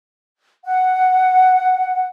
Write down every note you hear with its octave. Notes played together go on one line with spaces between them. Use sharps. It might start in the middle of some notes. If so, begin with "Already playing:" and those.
F#5